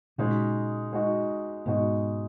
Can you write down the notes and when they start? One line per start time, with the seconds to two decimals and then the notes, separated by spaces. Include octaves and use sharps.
0.18 A#2 C#3 G#3 D#4 F#4
0.93 G#3 D#4 F#4
1.66 G#2 B2 G#3 D#4 F#4